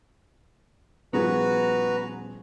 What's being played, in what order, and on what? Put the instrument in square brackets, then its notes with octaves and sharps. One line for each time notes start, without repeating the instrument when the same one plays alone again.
[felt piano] D#1 F3 G#4 [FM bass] B3 [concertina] F#4 B4 A#5